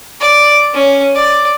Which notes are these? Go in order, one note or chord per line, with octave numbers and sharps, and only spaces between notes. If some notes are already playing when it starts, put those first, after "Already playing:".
D5
C#4
D5